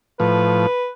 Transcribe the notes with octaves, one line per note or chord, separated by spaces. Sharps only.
A2 F3 B4